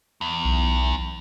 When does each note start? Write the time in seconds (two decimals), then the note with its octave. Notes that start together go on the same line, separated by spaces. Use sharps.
0.21 E2
0.45 B1